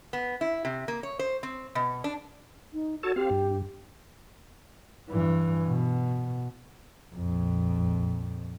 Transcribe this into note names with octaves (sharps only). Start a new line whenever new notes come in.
B3
E4
C3
A#3
C#5
C5
C4
B2
D4
D#4
F#4 A4 C#5 A5
C4 G4 F5
G2
G2 E3
B2
A#1 F2